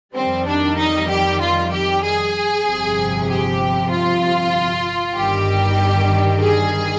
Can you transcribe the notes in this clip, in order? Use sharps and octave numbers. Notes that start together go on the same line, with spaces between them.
F2 D#3 G3 C4
D4
D#4
G4
F4
G4
G#4
G1 F2 C3 F3
G4
F4
G1 G2 D#3 G3 G4
G#4